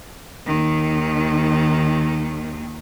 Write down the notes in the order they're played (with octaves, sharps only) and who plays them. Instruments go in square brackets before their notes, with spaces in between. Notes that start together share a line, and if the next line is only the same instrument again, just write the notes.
[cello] D#2 D#3